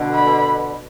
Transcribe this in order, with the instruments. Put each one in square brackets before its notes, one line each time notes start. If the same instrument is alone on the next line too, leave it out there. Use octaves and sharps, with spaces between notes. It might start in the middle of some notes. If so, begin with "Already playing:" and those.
Already playing: [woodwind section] B2 D3
[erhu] B5